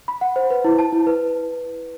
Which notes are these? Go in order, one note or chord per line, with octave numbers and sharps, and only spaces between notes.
B5
F#5
C5
B4
E4
A5
E4
B4